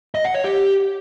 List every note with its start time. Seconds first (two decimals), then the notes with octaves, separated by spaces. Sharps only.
0.15 D#5
0.25 F#5
0.34 C#5
0.44 G4